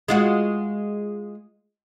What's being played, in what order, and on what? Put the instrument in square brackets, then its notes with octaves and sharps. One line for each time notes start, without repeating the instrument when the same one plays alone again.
[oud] G#3 F4 F#4